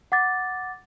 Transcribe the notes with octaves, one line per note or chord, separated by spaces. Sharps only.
F#5 D6 A6